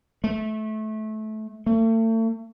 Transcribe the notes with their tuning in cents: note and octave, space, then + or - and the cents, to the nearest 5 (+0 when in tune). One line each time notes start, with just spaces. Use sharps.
A3 -20
A3 +40